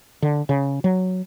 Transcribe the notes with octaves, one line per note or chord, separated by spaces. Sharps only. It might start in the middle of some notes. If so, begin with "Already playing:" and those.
D3
C#3
F#3